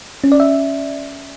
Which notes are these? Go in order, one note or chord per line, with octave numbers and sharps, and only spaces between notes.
C#4
D5
E5